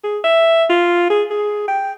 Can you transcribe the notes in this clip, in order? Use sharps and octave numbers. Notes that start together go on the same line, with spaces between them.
G#4
E5
F4
G#4
G#4
G5